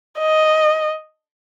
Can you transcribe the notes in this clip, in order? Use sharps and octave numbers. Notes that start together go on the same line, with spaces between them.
D#5